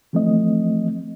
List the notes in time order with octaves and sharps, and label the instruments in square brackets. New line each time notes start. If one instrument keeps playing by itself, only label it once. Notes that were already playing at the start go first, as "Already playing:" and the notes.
[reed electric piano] E3 F3 A3 C4 D#5